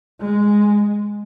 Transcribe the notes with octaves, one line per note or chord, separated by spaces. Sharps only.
G#3